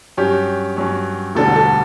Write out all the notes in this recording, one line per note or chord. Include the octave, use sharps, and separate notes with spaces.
G2 F#3 C#4 G4
G2 F#3 C#4
E1 D2 D3 G3 D4 A4
A4